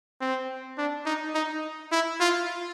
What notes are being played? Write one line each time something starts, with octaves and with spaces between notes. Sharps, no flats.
C4
D4
D#4
D#4
E4
F4